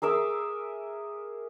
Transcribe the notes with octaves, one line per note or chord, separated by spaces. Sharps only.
G#4 A#4 E5 D6